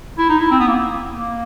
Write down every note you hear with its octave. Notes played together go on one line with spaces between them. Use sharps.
E4
D#4
E4
C4
B3
A#3
A#3